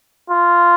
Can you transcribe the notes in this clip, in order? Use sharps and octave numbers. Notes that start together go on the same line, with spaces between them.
F4